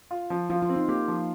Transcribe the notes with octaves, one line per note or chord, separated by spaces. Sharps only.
F4
F3
F3 F4
F4
C4
D#4
A#3 G4
F3